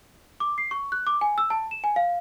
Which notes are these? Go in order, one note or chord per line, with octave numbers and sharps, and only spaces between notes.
D6
C7
C#6
F#6
D6
G#5
E6
A5
E7
G#5
F5